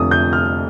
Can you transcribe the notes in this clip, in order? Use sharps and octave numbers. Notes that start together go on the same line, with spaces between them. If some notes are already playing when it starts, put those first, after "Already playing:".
Already playing: F1 F2 D3 F3 D#6
G6
F6